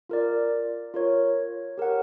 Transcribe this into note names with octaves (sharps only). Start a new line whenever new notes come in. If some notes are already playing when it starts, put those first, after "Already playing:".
F4 A#4 D5
F4 A#4 C#5
G4 A#4 C#5 F#5